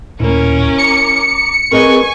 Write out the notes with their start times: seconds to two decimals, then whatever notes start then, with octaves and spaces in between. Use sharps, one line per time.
0.20 D#2 A#2 A#3 C#4 E4 A#4
0.78 A#5 D6 C#7
1.72 C4 G#4 A#4 B4 D#5 G#5 C#6